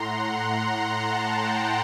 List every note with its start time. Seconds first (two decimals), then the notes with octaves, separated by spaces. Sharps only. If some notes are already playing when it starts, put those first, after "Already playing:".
Already playing: A2 F#5 A#5 C6
0.60 A#5
0.93 A5
1.26 G5